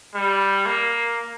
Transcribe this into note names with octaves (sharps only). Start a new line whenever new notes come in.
G3
A#3